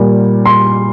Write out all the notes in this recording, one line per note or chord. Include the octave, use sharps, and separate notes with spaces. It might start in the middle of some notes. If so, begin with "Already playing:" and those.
Already playing: A#2 G3
C6